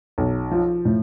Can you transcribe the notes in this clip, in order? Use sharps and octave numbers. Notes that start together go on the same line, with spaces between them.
B1
F3
A2